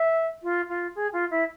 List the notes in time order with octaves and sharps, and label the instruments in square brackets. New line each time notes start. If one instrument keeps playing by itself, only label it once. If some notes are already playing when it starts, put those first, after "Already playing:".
Already playing: [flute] E5
F4
F4
G#4
F4
E4